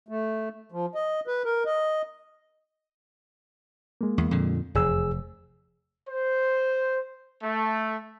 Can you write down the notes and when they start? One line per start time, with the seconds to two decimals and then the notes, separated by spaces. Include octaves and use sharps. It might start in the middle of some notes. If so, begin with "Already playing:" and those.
0.09 A3
0.72 F3
0.95 D#5
1.27 B4
1.45 A#4
1.66 D#5
4.01 G#3 A#3
4.18 E2
4.31 F2 A#2 D3
4.75 F1 E2 G#4 E6
6.08 C5
7.43 A3